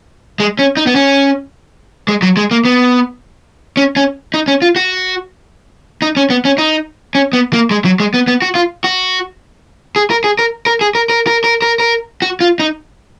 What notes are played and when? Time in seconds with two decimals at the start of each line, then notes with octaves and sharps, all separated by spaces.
0.40 G#3
0.59 C#4
0.77 D#4
0.87 B3
0.96 C#4
2.08 G#3
2.22 F#3
2.37 G#3
2.51 A#3
2.65 B3
3.77 C#4
3.96 C#4
4.34 D#4
4.48 C#4
4.62 F4
4.76 F#4
6.02 D#4
6.17 C#4
6.30 B3
6.45 C#4
6.58 D#4
7.15 C#4
7.33 B3
7.53 A#3
7.71 G#3
7.85 F#3
8.00 G#3
8.14 B3
8.28 B3
8.42 F#4
8.55 F4
8.84 F#4
9.96 G#4
10.10 A#4
10.24 G#4
10.39 A#4
10.66 A#4
10.81 G#4
10.95 A#4
11.10 A#4
11.27 A#4
11.44 A#4
11.62 A#4
11.80 A#4
12.22 F#4
12.41 F4
12.60 D#4